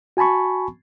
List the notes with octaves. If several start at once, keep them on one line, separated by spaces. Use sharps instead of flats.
F#4 G#5 A5 B5 C#6